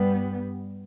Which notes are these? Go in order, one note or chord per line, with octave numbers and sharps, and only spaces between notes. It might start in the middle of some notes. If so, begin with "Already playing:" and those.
Already playing: G2 G3 B3